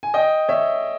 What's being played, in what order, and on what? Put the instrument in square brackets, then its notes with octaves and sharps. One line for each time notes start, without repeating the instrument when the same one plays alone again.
[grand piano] G#5
D#5 G5
C#5 E5